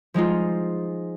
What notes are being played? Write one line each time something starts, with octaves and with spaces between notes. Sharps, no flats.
F3 G#3 D#4 F4